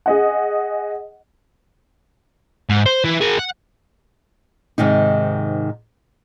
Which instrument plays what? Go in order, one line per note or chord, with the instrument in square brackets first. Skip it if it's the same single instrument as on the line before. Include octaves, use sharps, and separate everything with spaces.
[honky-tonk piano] G#4 D#5 F#5
[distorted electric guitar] G#2
C5
E3
G#4 A#4
F#5
[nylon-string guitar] G#2 C3 D#3 D#4